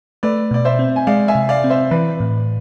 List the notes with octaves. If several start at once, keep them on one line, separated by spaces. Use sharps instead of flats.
A3 B4 D5
B2 D5
C5 E5
C4
G#5
G#3 D5 F5
E5 G#5
C3
D5 F5
C4
C5 E5
E3 B4 D5
A2